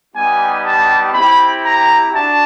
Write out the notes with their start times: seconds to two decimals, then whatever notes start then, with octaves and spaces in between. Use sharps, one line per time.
0.14 G3 B3 D#4 G4 G#5
0.64 A5
1.13 C4 E4 G4 B5
1.64 A#5
2.13 D4 F#4 A5